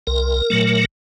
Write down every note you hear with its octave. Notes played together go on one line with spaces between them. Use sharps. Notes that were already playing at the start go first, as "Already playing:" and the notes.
C2 A#4
A#2 F#3 A3